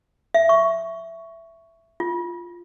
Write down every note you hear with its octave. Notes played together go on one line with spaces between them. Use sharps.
E5
C#6
F4